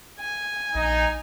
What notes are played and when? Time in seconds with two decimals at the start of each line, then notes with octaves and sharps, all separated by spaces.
0.20 G#5
0.75 A#1 D#4